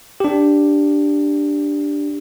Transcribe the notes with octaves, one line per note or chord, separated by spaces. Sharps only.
D4 G4